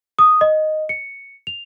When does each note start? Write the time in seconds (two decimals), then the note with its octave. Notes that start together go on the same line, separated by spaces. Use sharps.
0.19 D#6
0.41 D#5
0.89 C#7
1.47 F7